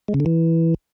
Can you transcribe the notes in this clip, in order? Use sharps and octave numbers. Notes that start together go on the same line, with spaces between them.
G#3
C#3
D3
E3